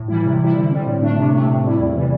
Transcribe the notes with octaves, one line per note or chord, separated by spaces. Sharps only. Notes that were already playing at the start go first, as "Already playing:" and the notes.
Already playing: A2
E3 G3 E4
C3
G3 E4
D3
G3 C4
A2
A3 D4
C3
A3 C4
A2
G3 E4
E2
C3 E3 G3